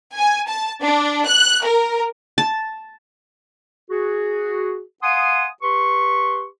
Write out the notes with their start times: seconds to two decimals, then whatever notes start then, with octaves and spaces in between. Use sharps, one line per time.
0.15 G#5
0.48 A5
0.83 D4
1.27 F#6
1.64 A#4
2.38 A5
3.90 F#4 G#4
5.03 F5 F#5 G#5 C6 D#6
5.63 G4 B4 C6 C#6